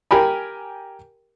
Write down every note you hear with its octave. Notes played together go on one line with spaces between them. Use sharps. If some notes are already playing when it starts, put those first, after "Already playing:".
G4 A#4 G5 G#5 B5